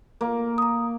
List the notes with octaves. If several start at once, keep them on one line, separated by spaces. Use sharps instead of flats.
A#3
A#5 D#6